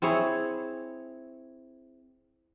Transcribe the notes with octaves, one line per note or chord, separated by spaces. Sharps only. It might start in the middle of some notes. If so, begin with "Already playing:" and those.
C4 E4 G#4 C#5